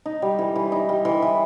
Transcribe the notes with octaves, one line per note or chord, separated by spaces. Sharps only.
D#4
G3
E3
E3
D#4
G3
E3
E3